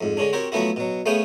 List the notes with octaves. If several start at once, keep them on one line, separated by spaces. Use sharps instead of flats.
F2 G#2
D3 G#3 C#4 D4
C4 F#4 G4 A#4 C#5
F3 F#3 A3 B3 E4 F#4
B2 F#3
A3 B3 C#4 G#4 F5 G5